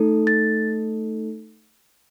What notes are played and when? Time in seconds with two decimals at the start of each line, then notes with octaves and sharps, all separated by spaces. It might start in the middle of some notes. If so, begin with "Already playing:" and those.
Already playing: A3 D#4 A4
0.27 A6